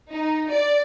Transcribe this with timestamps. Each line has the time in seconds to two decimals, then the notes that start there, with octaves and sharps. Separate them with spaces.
0.12 D#4
0.51 D5